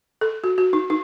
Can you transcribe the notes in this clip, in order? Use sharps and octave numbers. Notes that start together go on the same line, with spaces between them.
A4
F#4
F#4
D#4
D#4